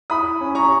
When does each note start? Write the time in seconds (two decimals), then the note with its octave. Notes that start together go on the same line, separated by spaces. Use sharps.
0.10 E4 B5 D#6
0.41 C#4
0.55 A#5 C#6